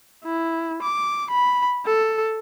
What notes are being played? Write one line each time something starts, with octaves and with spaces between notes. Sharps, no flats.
E4
D6
B5
A4